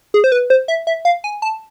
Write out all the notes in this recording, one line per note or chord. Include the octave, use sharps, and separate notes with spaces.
G#4
C5
B4
C5
E5
E5
F5
G#5
A5